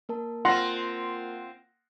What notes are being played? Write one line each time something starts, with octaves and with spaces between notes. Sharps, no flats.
A#3 A#4 A5
C4 F4 F#5 C6 A#6